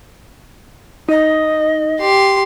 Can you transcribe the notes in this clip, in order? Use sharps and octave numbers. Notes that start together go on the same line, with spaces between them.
D#4 D#5
G4 C6